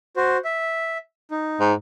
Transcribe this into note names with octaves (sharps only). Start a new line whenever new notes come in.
F#4 C5
E5
D#4
G#2